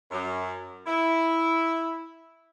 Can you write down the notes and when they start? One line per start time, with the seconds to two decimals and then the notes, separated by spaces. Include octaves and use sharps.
0.11 F#2
0.87 E4